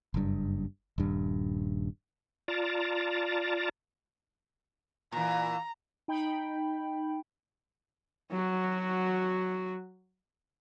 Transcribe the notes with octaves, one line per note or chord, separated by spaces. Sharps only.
F#1 G2
D#1 G2
F4 D5 A5 A#5
A#2 E3 A#5
D#4 G5 B5
F#3 F#4